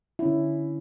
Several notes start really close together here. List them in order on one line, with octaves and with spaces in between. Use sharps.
E4 C#4 D3